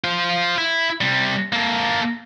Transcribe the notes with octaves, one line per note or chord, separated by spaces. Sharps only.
F4 C5
E4
C3 G3
A#3 A4